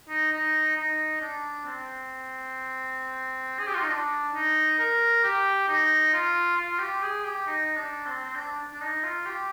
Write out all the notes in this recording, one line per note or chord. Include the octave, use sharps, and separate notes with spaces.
D#4
D#4
D#4
D4
C4
G#4
G4
F4
D#4
D4
D#4
A#4
G4
D#4
F4
F4
G4
G#4
G4
D#4
D4
C4
C4
D4
D4
D#4
F4
G4